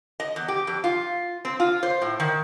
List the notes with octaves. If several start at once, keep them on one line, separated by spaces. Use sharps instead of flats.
D#5
E2
G4
F2
F4
C4
F4
C5
A2
D#3